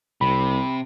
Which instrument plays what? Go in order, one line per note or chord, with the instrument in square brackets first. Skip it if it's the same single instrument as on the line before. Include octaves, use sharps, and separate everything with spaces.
[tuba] C2 [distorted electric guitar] C3 [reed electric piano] B5